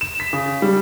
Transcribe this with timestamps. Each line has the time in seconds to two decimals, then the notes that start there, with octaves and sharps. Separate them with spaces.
0.01 E7
0.20 B6
0.33 C#3
0.62 G3